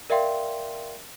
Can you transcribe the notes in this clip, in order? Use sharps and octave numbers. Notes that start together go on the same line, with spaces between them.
A#4 D5 E5 F5 G5 C6